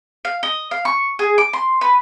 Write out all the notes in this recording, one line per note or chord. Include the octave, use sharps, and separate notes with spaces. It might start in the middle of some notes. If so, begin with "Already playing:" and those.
F5
D#5
F5
C#6
G#4
D6
C6
B4